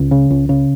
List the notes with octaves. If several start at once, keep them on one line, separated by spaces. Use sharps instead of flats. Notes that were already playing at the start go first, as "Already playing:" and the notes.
Already playing: C#2
C#3
C#2
C#3